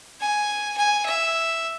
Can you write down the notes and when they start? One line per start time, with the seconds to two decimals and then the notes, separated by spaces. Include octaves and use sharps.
0.20 G#5
0.77 G#5
1.06 E5